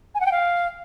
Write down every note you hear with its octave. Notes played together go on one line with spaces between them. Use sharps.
G#5
F#5
G5
F5